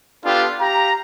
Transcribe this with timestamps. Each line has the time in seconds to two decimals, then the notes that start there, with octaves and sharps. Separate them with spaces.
0.24 B3 D4 F4 G4 A4
0.60 G4 F5 A#5